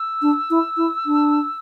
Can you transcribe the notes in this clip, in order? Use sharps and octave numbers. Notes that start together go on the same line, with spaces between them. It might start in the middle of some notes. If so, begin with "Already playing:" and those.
Already playing: E6
D4
E4
E4
D4